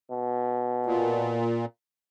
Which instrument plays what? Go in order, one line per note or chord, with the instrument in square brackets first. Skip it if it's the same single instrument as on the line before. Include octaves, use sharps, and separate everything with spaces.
[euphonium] B2
[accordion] A#2